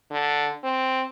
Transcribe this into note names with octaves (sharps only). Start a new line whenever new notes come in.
D3
C4